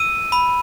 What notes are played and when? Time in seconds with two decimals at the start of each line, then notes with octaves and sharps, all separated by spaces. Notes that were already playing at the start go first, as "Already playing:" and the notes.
Already playing: E6 D#7
0.32 B5